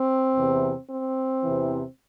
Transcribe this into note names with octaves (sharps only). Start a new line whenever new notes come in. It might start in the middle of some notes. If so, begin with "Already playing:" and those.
Already playing: C4
E2 C3 E3
C4
E2 C3 E3